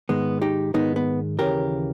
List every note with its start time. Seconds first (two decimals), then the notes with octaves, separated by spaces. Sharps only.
0.09 G#2 D#3 G#3 B3
0.42 D#4 G4
0.74 G#2 D#3 G#3 B3 D#4
0.96 B3
1.39 D#2 C#3 E3 G4 A#4